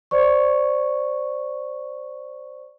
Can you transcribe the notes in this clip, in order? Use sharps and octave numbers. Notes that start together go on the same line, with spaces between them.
C5 D5 C#6